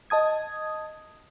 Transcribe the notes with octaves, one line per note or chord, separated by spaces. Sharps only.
D#5 A5 D#6 G#6